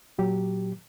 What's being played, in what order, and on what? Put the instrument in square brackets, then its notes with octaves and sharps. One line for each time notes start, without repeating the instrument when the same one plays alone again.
[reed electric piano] A#2 F#3 G4